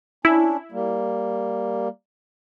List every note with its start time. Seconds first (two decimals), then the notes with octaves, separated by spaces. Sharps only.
0.25 C#4 D4 E4
0.72 G3 A#3